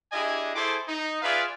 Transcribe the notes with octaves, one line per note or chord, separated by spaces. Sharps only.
D4 E4 G4 G#4 D#5 G#5
E4 G#4 A4 C5 C6 D6
D#4
F4 G#4 B4 D5 E5 F5